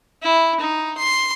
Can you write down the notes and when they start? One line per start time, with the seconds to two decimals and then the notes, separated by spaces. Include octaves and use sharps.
0.23 E4
0.60 D#4
0.98 C6